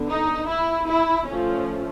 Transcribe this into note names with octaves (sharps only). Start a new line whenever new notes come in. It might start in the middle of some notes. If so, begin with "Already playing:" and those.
Already playing: D3 B3
D#4
E4
E4
F3 A3 C#4